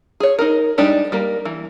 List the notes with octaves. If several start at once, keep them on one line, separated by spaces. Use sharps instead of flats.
G#4 C#5
D#4 G#4 A#4
G3 G#3 D4 D#4 G4
G3 A#3 A#4
E3